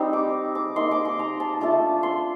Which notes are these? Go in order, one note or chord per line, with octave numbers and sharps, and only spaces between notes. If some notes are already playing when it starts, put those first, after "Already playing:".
Already playing: G3 C4 D#4
D6
D6
A#3 D#4 C6
D6
C6
A#5
A5
A3 D4 F4 A5
C6